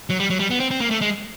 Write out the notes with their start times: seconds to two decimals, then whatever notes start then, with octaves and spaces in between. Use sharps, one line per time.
0.10 F#3
0.19 G3
0.30 F#3
0.39 G3
0.50 B3
0.60 C4
0.71 C4
0.80 A#3
0.91 A3
1.01 G#3